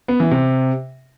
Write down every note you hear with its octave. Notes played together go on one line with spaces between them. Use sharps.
B3
E3
C3